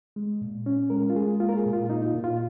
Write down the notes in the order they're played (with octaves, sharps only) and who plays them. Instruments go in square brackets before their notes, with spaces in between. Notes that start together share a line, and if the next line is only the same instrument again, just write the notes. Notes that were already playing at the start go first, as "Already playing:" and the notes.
[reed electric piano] G#3
A#2
C#4
G#3 A#4
F4
G#3 G#4
A#3 F4
A#4
G#4
A#2
F4
A#3 D#4
F4
A#2
F4